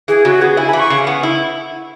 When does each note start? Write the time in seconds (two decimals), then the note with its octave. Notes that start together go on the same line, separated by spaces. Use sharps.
0.08 E3 G#4
0.25 C#3 F#4
0.41 B3 G#4
0.57 E4 G#5
0.69 E3 B5
0.79 C#6
0.90 C#3
1.07 B3
1.23 E4